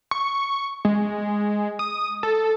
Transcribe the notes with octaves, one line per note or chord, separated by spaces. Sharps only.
C#6
G#3
D#6
A4